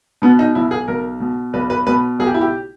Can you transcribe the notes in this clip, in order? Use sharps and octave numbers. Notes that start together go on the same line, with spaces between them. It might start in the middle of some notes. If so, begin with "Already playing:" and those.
B2 B3
D#4
B1 E4
G#4
B1 A#4
B2
B1 B4
B4
B2 B4
B1 G#4
G4
E4
G4